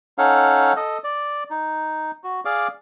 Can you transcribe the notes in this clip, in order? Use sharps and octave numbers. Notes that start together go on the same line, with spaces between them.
C#4 D#4 A4 C#5 F5 F#5
A4 D#5
D5
D#4
F#4
G#4 D5 F5 D6